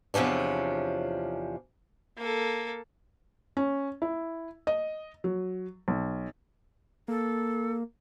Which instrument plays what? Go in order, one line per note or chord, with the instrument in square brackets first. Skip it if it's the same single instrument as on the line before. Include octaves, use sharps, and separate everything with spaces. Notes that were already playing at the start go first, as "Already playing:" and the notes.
[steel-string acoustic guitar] E2 C3 F3 C#4 D4
[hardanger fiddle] A#3 A4
[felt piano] C#4
E4
D#5
F#3
B1
[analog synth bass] A#3 [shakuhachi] A4